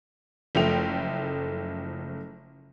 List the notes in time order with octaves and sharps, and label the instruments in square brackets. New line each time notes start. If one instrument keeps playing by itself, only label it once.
[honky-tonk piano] F#1 F3 A3 G5 F7